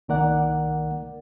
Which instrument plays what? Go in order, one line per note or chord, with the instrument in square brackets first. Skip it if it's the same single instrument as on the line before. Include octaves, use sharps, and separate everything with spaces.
[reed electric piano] C2 D#3 A#3 A#4 D5 F#5